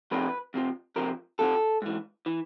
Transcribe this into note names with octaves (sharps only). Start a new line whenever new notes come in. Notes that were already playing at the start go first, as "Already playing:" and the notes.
F2 C3 F3 B4
F2 C3 F3
F2 C3 F3 A#4
F2 C3 F3 A4
G#2 E3
E3